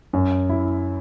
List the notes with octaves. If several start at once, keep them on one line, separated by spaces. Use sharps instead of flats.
F#2
E4